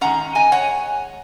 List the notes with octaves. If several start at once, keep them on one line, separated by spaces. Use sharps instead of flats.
D#3 G#3 C#4 F#5 A#5
D#5 G#5
C#5 F#5